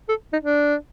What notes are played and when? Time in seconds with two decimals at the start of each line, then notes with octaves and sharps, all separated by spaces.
0.09 A4
0.33 D#4
0.44 D4